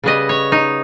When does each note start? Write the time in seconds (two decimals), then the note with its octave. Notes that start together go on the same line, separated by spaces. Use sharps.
0.03 C#3 G3 B3 D#5
0.29 C#5
0.52 D#4